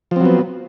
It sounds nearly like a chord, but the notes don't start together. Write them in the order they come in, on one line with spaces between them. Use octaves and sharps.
F3 C4 F#3 B3